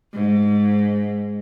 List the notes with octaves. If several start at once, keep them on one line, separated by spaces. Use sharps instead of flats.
G#2